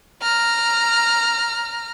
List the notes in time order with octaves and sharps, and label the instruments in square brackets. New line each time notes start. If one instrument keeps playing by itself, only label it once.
[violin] A#5 F6